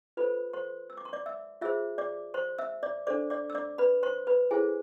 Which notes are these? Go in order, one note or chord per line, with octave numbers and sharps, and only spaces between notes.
F4 A4 B4 C5 B5
C5 C6
E6
D6
C6
D5 D6
E5 E6
F4 G#4 C5 E5 E6
D5 D6
C5 C6
E5 E6
D5 D6
D4 A4 C5 D5 D6
D5 D6
E6
D5 D6
B4 B5
C5 C6
B4 B5
E4 G#4 A4 C5 G#5